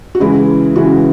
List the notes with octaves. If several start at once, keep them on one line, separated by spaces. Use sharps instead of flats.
F#4
C#3 E3 G#3 E4
C#3 E3 G#3 F#4